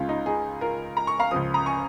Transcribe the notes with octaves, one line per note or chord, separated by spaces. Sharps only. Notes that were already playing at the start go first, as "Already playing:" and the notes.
Already playing: C#2 C#3 G#3 F4
D#4
D#4 G#4
F4 A#4
A#5
C#6
F5 A#5
C#2 C#3 F3 D#6
A#5 D#6
G#5 C#6